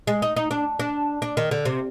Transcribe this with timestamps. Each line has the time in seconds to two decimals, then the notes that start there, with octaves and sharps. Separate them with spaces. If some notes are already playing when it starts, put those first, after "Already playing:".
0.07 G#3
0.22 D#4
0.36 D#4
0.51 D4
0.79 D4
1.22 D4
1.37 D#3
1.51 D3
1.65 C3